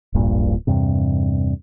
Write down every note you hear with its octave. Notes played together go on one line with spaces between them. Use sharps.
D1 A#1 G2 A#2
E2 G2 C3